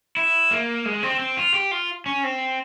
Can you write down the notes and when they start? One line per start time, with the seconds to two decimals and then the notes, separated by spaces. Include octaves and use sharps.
0.17 E4
0.51 A#3
0.85 G#3
1.03 C4
1.19 C4
1.37 F4
1.54 G4
1.71 F4
2.06 C#4
2.24 C4